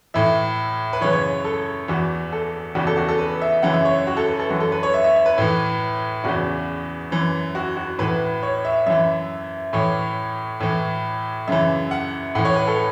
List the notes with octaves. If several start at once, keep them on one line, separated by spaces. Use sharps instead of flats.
A2 E3 E5
B4
F#2 C#3 E3 C#5
C#5
A4
E2 E3 F#4
A4
E2 C#3 E3 F#4
A4
F#4
A4
B4
E5
F#2 C#3 E3 F#5
E5
C#5
F#4
A4
B4
A4
F#2 E3 F#4
A4
B4
C#5
E5
E5
E5
B4
A2 E3
E2 C#3 E3 F#4
F#2 E3
F#4
F#4
A2 E3 B4
C#5
E5
F#2 E3 E5
A2 E3 C#5
A2 E3
F#2 C#3 E3 E5
F#5
A2 E3 F#5
C#5
B4
A4